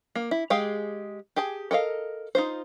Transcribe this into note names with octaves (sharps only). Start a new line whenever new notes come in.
A#3
E4
G#3 G4 G#4 F5
G4 G#4 G#5 A5
A4 A#4 D#5 F5
D#4 F4 C5